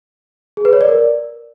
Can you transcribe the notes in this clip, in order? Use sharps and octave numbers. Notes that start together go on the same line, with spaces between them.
G#4
B4
C#5
D5
A#4